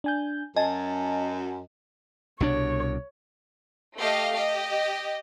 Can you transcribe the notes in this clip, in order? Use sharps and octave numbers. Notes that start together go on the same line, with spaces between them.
D4 G#5 G6
F#2 D#5 G#5 A5
C2 B2 D4 C#5
A3 G4 D#5 F5
G4 D#5